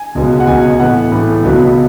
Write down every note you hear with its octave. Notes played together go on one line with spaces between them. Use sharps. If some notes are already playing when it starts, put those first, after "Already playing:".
Already playing: G#5
C#2 B2 G#3 B3
F#5
C#2 B2 G#3 B3 G#5
A2 E3 B3 F#5
A2 E3 B3
C#2 B2 F#3 B3